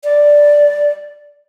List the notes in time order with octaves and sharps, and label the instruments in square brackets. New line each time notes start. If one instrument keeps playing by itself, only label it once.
[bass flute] D5